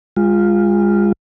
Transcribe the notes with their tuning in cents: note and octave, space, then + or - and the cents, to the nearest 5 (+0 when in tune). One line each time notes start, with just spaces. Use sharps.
G#3 -30 F4 +0